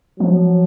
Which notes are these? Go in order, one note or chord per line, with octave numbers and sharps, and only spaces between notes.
F3 F#3